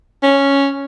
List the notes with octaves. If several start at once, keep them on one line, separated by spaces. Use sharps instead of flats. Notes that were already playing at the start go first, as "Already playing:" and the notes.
C#4